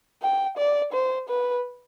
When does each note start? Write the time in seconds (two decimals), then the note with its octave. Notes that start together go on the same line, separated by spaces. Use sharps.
0.22 G5
0.57 D5
0.93 C5
1.29 B4